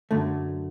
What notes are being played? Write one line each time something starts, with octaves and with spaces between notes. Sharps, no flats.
F#2 D3 F#3 A3